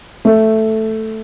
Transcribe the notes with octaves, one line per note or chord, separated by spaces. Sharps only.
A3